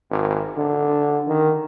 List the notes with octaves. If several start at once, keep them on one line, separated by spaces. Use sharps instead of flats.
G#1
D3
D#3